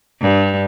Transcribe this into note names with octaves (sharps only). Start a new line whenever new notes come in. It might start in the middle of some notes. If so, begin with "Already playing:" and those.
G2